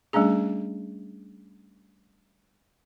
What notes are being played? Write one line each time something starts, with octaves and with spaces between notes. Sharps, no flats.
G3 A3 C#4 D4 G#4